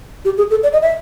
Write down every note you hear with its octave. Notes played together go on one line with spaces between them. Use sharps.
G4
G#4
A4
D5
D#5
E5